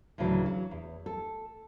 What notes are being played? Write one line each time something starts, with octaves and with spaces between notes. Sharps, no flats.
D2 A2 C#3 E3 F#3
F#3
E2
A4